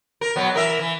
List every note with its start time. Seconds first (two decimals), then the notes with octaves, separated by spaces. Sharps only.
0.21 A#4
0.36 B2 F#3 B3
0.54 E3 A#4 E5
0.79 E3